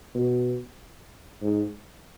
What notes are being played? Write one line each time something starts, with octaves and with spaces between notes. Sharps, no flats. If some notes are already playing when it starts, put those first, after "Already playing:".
B2
G#2